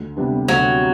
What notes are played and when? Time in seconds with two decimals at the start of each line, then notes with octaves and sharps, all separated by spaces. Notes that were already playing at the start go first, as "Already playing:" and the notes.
Already playing: D2
0.16 C3 G3 B3 D4
0.48 D2 F#3